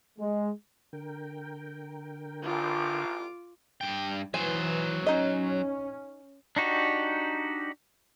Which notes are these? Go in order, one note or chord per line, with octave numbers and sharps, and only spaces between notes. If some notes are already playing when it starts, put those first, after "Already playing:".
G#3
D3 A#4 G5
A1 F4 D6
G2 G5
E3 F#3 C5 G#5
C#4 D#4 D#5
D4 D#4 F#4 G4